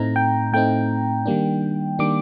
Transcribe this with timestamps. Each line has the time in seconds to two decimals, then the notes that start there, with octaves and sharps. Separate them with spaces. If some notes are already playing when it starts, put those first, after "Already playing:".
Already playing: A2 A3 C4 D#4 A#5
0.16 G5
0.52 A2 A3 C4 D#4 G5
1.26 D#3 G3 A#3 D4
1.99 D#3 G3 A#3 D4 D6